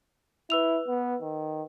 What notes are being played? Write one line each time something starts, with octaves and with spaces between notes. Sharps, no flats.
E4 B4 E6 F7
B3
D#3